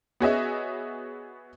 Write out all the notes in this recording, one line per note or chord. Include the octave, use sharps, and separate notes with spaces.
B3 F#4 G#4 C#5 D#5 E5